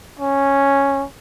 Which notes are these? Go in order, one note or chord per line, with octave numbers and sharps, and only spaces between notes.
C#4